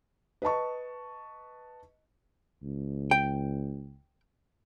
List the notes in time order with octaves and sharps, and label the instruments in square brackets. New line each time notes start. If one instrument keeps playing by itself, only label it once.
[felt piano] B4 D#5 A5 C#6
[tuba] C#2
[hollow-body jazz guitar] G5